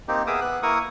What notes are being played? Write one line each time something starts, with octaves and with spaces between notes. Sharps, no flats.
A#3 C4 D#4 G4
B3 G#4 A#4 E5 D6 D#6
B3 F#6
A#3 E4 A#4 C#6 D#6